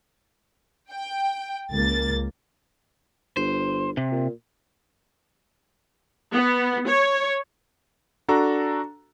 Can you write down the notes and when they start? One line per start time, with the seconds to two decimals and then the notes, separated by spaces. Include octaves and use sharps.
0.92 G5
1.70 C#2 A#3 A6
3.37 G1 C5
3.97 C3
4.12 A#2
6.34 B3
6.88 C#5
8.28 D4 F#4 A4 A#5